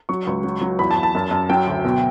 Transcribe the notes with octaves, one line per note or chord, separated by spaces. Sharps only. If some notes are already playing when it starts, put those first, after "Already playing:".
F#3 C#6
C#2
F#3
F#3
E2 B5
A5
E2
A5
F#2
F#2
F#3 G5
D2
B2